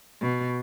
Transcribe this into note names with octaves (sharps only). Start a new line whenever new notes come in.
B2